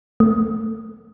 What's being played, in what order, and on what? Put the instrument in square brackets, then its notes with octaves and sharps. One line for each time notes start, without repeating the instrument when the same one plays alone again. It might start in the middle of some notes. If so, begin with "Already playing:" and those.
[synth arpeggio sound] A3